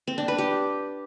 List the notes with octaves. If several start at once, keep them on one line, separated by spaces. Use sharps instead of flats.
C4
D4
B4
G4